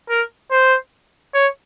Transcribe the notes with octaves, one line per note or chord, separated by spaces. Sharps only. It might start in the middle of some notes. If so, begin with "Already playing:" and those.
A#4
C5
C#5